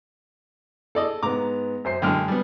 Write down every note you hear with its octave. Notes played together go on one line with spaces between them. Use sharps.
G#4 A4 D5 D#5
G#2 B3 A#5 D6
F#2 C5 C7
F#2 D3 G#3 G5 F6
G3 B3